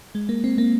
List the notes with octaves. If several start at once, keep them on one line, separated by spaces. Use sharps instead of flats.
G#3
A#3
C4
A#3